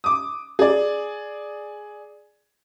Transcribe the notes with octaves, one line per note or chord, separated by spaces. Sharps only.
D6 D#6
G#4 D5